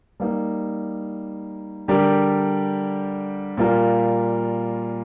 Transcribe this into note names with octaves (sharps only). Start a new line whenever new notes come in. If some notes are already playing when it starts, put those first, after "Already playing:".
G3 A#3 D#4
D3 G3 D4 G4 A#4
A#2 G3 A#3 F4 A#4